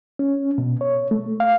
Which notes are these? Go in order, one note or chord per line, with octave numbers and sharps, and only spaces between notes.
C#4
B2
C#5
A3
F5